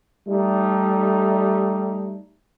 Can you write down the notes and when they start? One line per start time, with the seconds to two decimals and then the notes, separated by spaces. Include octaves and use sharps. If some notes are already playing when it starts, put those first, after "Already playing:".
0.28 G3 A3 D#4